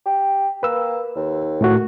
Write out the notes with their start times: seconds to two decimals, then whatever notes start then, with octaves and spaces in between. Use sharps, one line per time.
0.06 G4
0.63 A#3 B4 E6
1.16 D#2
1.61 A2 A3 F#4